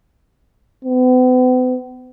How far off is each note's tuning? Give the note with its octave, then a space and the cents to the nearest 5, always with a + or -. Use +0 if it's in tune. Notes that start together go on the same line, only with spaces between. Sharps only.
B3 +45